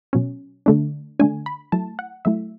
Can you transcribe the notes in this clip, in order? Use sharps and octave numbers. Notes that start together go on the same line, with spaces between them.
B2 F#3 C#4
D3 A3 D4
D3 A3 D4 G#5
B5
F#3 A3 E4 A5
F#5
F#3 A3 E4 E5